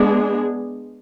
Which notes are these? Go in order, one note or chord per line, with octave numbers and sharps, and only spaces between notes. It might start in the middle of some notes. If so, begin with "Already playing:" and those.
Already playing: G#3 B3 D4 G#4